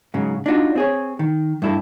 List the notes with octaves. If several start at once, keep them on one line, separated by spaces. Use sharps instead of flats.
G#2 C#3 F#3
D4 D#4 F4 F#4
C4 G#4 C#5
D#3
G2 E4 A4